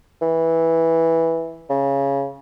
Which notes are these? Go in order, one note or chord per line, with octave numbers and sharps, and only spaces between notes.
E3
C#3